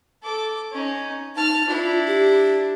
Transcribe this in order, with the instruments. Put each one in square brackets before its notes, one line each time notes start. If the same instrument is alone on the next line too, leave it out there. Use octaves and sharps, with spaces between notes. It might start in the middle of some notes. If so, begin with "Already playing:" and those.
[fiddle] A4 D6
C#4 D#4
[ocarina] D#4 [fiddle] A5 F6
[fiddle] D4 E4 [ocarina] F4
[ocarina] G4